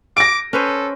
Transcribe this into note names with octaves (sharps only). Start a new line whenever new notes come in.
D6 A#6 D7
C#4 A4 B4 C5